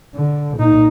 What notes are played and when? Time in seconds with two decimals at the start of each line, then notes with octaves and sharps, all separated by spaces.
0.15 D3
0.57 A#2 D#4